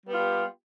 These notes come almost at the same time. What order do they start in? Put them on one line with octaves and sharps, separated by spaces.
G3 B3 F4 G4